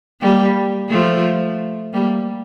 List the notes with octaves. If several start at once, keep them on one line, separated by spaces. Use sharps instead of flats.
G3 A#3
F3 A3
G3 A#3